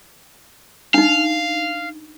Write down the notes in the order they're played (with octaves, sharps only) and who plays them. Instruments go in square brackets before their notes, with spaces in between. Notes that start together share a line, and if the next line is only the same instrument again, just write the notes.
[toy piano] D4 D#4 [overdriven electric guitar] F5